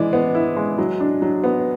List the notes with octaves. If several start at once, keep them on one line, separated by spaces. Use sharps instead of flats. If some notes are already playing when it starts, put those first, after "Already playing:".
Already playing: E3 G#3 E4 D5
B3
E4
G#3
F#3
D4
F#3
B3